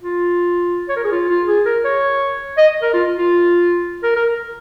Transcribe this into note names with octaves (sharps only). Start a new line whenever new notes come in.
F4
C#5
A#4
G#4
F4
F4
G#4
A#4
C#5
D#5
A#4
F4
F4
A#4
A#4